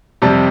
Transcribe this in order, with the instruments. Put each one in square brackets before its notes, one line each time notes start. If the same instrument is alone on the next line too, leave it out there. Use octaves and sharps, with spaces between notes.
[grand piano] F2 C3 G3 A5